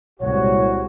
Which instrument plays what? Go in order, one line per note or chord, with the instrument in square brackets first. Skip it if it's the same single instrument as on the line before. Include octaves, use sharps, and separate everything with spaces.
[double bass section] C2 A#2 G#3 [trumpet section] F#4 [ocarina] C#5